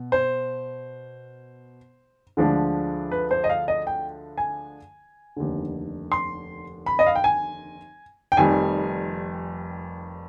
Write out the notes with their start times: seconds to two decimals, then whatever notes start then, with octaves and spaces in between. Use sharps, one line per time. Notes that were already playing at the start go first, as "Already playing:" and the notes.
Already playing: B2
0.12 C5
2.37 D2 D3 F3 G#3 D4
3.11 B4
3.31 C5
3.44 D#5
3.49 F5
3.68 D#5
3.87 G5
4.38 G#5
5.37 F1 D#2 D3
6.12 C6
6.86 B5
6.99 D#5
7.06 F5
7.15 G5
7.24 G#5
8.32 G5
8.37 F1 F2 D#3 G3 G#5